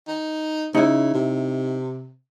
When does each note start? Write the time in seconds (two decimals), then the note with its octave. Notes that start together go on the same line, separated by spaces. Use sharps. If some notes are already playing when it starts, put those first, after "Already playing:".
0.08 D#4
0.74 C#3 D#4 E4
1.14 C3